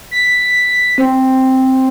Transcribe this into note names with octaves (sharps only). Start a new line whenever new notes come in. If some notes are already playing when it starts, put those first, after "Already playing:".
B6
C4